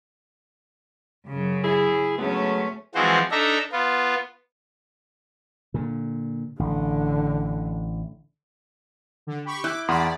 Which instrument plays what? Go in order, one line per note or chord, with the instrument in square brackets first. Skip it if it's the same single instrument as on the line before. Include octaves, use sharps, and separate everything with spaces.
[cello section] F#2 C#3
[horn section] E4 G#4
[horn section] F#3 G#3 B3 [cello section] A3 C#4
[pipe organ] E3 F3 G#3 C4 F#4 C5
D4 D#4 A4 E5 A#5
B3 F4
[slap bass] A#2 D3
[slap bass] A1 [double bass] D3
[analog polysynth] D3
G4 B5 C#6
[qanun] E4 [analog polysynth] D6 [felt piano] E6 F#6 G6
[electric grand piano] E2 F#5 B5 [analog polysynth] D5 [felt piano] C6 D#6 F6